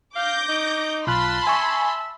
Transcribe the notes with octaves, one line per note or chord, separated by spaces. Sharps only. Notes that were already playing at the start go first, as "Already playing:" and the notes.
F5 D6 G6 A#6
D#4
B1 F4 A5 B5 C6 F#6
E5 G#5 C#6